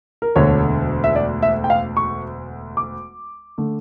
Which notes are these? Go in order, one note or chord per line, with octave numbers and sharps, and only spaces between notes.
A#4
E1 D2 D3 C#5
E5
D5
E5
G5
F5
C#6
D6
D3 A3